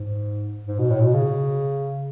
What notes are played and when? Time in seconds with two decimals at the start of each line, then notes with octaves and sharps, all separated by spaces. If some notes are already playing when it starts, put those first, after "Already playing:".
Already playing: G#2
0.66 G#2
0.79 B2
0.90 A2
1.01 B2
1.13 C#3